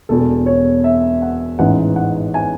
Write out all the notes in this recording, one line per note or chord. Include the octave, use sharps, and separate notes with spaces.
E1 E2 B2 A4
C#5
E5
F#5
A1 G#2 E3 F#5
F#5
G#5